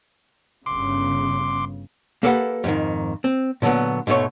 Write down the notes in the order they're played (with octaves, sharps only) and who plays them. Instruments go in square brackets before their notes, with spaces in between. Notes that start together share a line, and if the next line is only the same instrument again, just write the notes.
[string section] G1 C#3 [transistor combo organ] C6 D6
[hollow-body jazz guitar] A#3 G4 A4 B4 F#5
F2 G#2 D#3
C4
A#2 D3 E3 F#3 B3
G#2 B2 A3 C#5